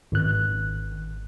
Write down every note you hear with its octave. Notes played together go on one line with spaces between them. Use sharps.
G#1 F#6